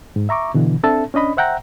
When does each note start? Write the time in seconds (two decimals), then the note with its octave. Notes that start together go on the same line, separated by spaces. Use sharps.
0.16 G#2
0.29 E5 A#5 C#6 D6
0.54 B2 D3 E3
0.83 C4 D4 A4 E5 A5
1.14 C#4 D4 D#5 B5
1.37 C5 E5 F#5 G5 A#5